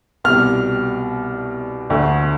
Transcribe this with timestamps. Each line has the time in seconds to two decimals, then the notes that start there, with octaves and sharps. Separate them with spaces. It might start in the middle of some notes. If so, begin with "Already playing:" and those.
0.24 C2 B2 G3 F6
1.90 D2 D3 A3